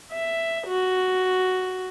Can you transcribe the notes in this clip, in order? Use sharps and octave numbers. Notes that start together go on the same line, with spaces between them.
E5
F#4